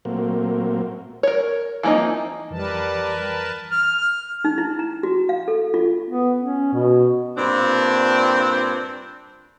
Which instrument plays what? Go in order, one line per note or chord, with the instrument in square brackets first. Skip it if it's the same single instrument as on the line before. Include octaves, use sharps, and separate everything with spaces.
[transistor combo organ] A#2 F#3 A3 A#3 C4
[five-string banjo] A#4 C#5
E3 F3 A#3 C4 D#4
[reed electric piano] F2 E3 [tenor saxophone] G3 [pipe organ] A#4 B4 A5
[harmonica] F6
[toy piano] D#4
E4
A#5
F#4
F5
A4
F4
[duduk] B3
C#4
B2
[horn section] G2 A#2 C4 D4